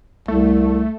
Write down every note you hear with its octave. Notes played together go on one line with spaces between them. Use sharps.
C2 A3